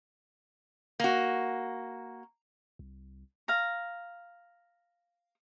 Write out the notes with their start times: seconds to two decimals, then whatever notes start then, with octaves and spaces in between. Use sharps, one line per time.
1.00 A#3 F#4
2.79 C2
3.48 F5 A#5